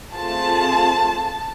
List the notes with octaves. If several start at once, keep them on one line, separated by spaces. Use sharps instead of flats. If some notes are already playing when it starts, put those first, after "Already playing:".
A3 C4 F4 G#4 A5